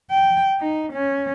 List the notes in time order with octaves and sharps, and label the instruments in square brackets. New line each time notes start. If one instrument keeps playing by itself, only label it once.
[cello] G5
D#4
C#4